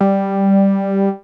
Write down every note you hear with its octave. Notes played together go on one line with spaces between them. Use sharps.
G3